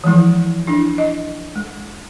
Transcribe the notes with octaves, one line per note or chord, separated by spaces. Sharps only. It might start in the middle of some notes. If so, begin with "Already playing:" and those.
E3 F3 G#3 E4
D4 E4
D#5
G#3